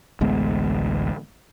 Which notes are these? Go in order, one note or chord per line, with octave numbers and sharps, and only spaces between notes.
A1 D2 G#3 B3